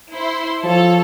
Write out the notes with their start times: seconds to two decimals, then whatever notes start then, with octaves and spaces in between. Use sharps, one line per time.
0.13 E4 C5 C6
0.63 F3 A4 C#5 A5